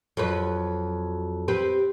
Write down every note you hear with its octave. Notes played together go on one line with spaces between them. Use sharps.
F2 F#3 B4
C4 G4 B4